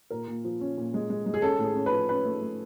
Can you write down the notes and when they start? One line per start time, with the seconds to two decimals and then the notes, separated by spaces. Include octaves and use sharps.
0.10 A#2 A#4
0.28 A#2
0.44 F3
0.60 C#4
0.77 A#2
0.94 G#3
1.10 G#3
1.26 G#3
1.34 G#4
1.42 C#4 A4
1.59 A2
1.64 G#4
1.75 C#4
1.86 B4
1.92 F3
2.09 C#4 B4
2.25 A3
2.41 A3